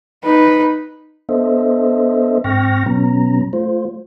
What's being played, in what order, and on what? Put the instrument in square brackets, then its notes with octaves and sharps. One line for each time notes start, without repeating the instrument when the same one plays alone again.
[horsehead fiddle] D#4 B4
[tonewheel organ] B3 D4 A4 C5 D#5 E5
G#2 C4 G5 C#6 F6 A#6
B2 F#3 B3 C#4 A#5
A3 F4 C5